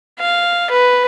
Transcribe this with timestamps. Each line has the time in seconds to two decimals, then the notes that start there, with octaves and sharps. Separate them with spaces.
0.19 F5
0.71 B4